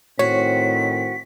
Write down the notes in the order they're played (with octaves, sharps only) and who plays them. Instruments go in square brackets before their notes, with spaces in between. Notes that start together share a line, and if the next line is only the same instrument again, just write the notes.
[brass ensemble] A2 D#3 C4 [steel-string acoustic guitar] F#4 [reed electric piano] C#5 [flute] B6